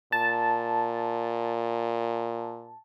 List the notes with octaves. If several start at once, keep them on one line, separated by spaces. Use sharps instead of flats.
A#2 A5